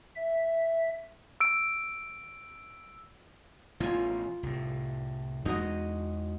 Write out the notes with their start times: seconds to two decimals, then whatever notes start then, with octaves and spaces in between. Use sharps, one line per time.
0.16 E5
1.40 E6 D7
3.80 A1 B2 F3 F4 G#5
4.43 C2 A2
5.45 E2 G#3 D#4 F#4 D#5